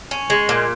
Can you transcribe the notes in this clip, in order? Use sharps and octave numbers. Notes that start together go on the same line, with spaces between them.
C#4
G#3
A#2